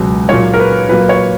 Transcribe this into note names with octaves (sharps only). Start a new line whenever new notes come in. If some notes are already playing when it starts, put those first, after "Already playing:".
Already playing: C#2 B2 F#3
A#2 F#3 A#3 C#5
A#4
B4
A#2 F#3 A#3 B4
C#5